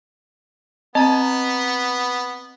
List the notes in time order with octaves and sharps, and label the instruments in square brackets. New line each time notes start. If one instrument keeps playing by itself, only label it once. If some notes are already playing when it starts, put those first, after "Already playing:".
[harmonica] B3 [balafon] C4 [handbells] D#5 A#5